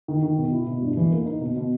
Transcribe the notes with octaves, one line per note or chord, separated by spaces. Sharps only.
D#3
D#3
B2
E4
B2
G2
E3
A#3
D#4
B2
B2